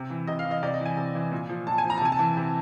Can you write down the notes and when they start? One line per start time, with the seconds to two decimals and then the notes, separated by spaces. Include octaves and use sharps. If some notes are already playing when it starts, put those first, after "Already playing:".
Already playing: C3
0.10 E3
0.28 C3 D#5
0.39 F5
0.45 E3
0.51 D#5
0.63 C3 D5
0.74 D#5
0.80 E3
0.85 G#5
0.97 C3
1.15 E3
1.32 A#2
1.49 F3
1.67 A#2 A5
1.78 G#5
1.84 F3
1.90 A#5
1.98 A5
2.01 C3 G#5
2.12 A5
2.19 E3
2.37 C3